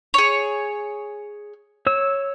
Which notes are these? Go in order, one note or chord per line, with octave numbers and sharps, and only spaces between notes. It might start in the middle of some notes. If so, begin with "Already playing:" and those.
G#4 C#5
C#5 E6